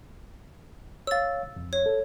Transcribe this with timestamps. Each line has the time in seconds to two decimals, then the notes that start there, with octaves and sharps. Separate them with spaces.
1.07 C#5 F5 E6 A6
1.56 F2
1.73 C#5
1.86 A4